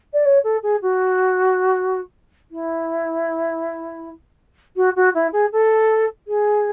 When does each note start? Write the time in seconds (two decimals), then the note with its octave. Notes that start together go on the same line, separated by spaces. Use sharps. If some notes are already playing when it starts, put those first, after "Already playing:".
0.13 D5
0.25 C#5
0.44 A4
0.63 G#4
0.82 F#4
2.51 E4
4.76 F#4
4.96 F#4
5.14 E4
5.32 G#4
5.52 A4
6.27 G#4